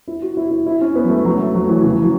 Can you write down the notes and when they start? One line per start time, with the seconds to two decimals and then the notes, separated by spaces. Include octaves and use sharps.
0.08 E4
0.22 F#4
0.37 E4
0.51 E4
0.66 E4
0.81 C#4
0.95 B3
1.04 F#3
1.09 A3
1.25 F#3
1.40 A3
1.54 F#3
1.69 E3
1.83 C#3
1.93 E3
2.02 F#3